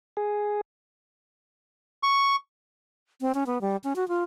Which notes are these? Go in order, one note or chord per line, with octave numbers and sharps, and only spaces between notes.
G#4
C#6
C4
C#4
B3
G3
C#4
F#4
F4